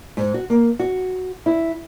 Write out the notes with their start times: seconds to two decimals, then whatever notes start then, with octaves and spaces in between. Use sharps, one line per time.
0.17 G#2
0.34 F#4
0.50 A#3
0.79 F#4
1.46 E4